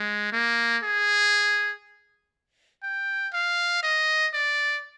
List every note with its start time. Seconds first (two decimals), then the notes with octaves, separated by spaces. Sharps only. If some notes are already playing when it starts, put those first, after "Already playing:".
Already playing: G#3
0.32 A#3
0.83 G#4
2.83 G5
3.34 F5
3.83 D#5
4.34 D5